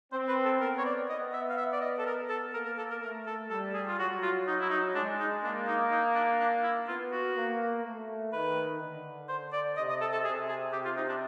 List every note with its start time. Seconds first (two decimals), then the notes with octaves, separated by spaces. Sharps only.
0.12 C4 C5
0.28 B4
0.45 A4
0.60 B3 A#4
0.78 C#5
0.85 D5
1.09 B3 D#5
1.33 E5
1.49 F5
1.57 E5
1.72 D5
1.81 D#5
1.98 A4
2.06 A#4
2.29 A4
2.54 A#3 A#4
2.65 A#4
2.78 A4
2.90 A#4
3.01 A3 A#4
3.26 A4
3.50 G3 A4
3.74 G#4
3.87 F4
3.98 F#3 F#4
4.22 F4
4.47 F#3 D#4
4.60 E4
4.70 D#4
4.94 G#3 D4
5.19 D#4
5.43 A#3 D4
5.67 D#4
5.91 D#4
6.15 D4
6.40 D4
6.63 E4
6.87 B3 F4
7.12 F#4
7.35 A#3
7.84 A3
8.33 D#3 B4
8.80 D3
9.28 C5
9.52 D5
9.77 C3 D#5
9.89 D#5
10.01 A4
10.12 A4
10.24 C3 G#4
10.48 G#4
10.72 C3 G4
10.85 F4
10.97 D#4
11.09 D4